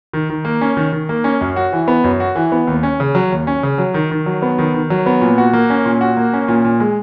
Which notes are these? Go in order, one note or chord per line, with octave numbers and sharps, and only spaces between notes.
D#3
D#3
A#3
C#4
D#3
D#3
A#3
C#4
F#2
F#4
E3
B3
F#2
F#4
E3
B3
D#2
C#4
C#3
F#3
D#2
C#4
C#3
F#3
D#3
D#3
F#3
B3
D#3
D#3
F#3
B3
A#2
F#4
A#3
C#4
A#2
F#4
A#3
C#4
A#2
A#2
G#3